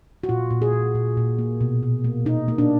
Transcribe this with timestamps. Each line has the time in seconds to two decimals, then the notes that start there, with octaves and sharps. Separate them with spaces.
0.24 F#4
0.29 A#2 F4
0.51 A#2
0.62 G#4
0.73 A#2
0.95 A#2
1.17 A#2
1.39 A#3
1.61 B2
1.83 B2
2.04 A#3
2.26 B2 D#4
2.48 A#3
2.58 D4